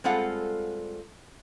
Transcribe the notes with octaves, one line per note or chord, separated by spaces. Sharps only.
G3 G#3 C4 F4 A4 F#5